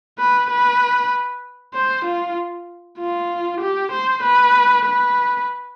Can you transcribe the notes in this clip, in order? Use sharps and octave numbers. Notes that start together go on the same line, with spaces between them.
B4
B4
C5
F4
F4
G4
C5
B4
B4